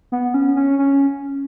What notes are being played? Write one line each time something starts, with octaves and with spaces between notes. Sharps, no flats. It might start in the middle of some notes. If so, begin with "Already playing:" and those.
B3
C#4
C#4
C#4